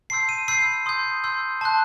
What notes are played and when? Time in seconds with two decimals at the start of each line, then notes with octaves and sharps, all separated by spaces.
0.10 A5 C6 E6 G6 C7
0.29 D#7
0.48 B5 E6 G6 C7
0.86 C6 D#6 G6
1.24 C6 E6 G6
1.61 A5 C6 F#6